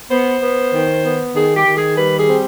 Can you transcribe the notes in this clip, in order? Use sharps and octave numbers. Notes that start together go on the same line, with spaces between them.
B3 C5
B3
D#3
B3
D#3 G#4
G4
D#3
G#4
G3 B4
G#4
C4